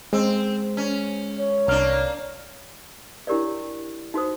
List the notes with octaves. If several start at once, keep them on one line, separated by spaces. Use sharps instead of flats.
G#3 C4
C#4
C#5
C2 A#3 D4 F6
D4 E4 G4 A#4 C#5 D5
D#4 F#4 C5 D#6